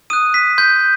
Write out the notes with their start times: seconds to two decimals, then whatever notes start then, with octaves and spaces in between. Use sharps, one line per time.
0.10 D#6 F#6 D#7
0.34 B6
0.58 C6 G6